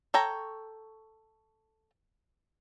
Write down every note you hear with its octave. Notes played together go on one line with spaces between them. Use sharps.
A4 C#5 G5 A#5